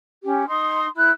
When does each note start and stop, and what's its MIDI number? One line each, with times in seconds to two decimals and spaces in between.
0.24 0.45 61
0.24 0.45 67
0.47 0.86 63
0.47 0.86 84
0.47 0.86 87
0.95 1.09 64
0.95 1.09 90